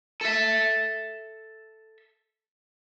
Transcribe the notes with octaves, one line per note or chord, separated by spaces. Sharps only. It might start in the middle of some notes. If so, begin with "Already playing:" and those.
A4 E5